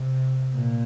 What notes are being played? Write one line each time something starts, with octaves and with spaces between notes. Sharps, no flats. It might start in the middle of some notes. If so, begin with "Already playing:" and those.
Already playing: C3
A#2